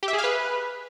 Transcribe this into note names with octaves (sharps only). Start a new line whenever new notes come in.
G4
E5
G#4
F5
B4